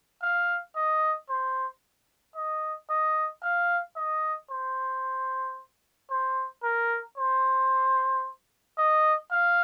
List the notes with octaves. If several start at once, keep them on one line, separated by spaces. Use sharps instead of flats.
F5
D#5
C5
D#5
D#5
F5
D#5
C5
C5
A#4
C5
D#5
F5